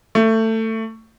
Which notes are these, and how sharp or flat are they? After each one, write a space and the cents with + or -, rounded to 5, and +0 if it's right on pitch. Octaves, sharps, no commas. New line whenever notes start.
A3 +20